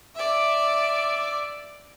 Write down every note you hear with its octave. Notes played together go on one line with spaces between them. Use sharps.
D5 E5